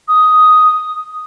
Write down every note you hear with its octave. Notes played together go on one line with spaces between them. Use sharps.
D#6